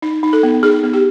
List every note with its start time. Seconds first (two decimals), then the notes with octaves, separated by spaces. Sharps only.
0.02 D#4
0.23 D#4
0.33 A4
0.43 B3
0.63 D#4 G#4
0.83 B3
0.93 G4